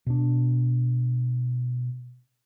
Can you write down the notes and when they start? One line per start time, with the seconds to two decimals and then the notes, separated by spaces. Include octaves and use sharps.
0.06 B2 D4